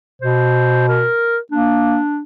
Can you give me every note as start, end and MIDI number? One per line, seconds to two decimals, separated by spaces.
0.22 1.07 47
0.22 0.89 72
0.89 1.38 70
1.52 1.98 58
1.52 2.22 62